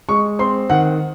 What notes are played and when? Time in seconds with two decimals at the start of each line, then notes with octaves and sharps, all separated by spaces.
0.09 G#3 C#6
0.39 C4 C6
0.70 D#3 F#5